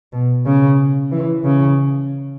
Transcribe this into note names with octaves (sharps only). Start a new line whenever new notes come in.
B2
C#3
E3
C#3